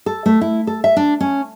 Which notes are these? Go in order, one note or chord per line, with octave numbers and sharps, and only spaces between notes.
A4
A3
E4
A4
E5
D4
C#4